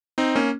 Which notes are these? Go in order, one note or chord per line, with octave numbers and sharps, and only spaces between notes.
C4 D#4
A#3 C#4